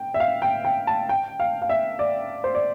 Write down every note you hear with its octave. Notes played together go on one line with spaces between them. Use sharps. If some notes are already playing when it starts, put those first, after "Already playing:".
Already playing: G5
E5
F5
G5
G5
A5
G5
F5
F5
E5
D5
C5
D5